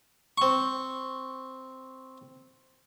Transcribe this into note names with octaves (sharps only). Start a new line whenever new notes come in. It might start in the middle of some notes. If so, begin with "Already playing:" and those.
C4 C#6